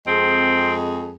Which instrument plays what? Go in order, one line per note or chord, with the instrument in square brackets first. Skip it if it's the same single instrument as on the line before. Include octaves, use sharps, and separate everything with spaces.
[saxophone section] F2 G#3 G#4 [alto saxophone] C4